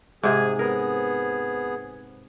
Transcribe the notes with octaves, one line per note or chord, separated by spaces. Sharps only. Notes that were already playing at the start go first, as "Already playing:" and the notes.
G#2 C3 G#4 G#5
B3 G#4 A#4